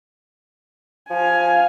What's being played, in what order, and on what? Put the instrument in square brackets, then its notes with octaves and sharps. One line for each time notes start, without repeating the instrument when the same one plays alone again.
[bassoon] F3 [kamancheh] F5 G#5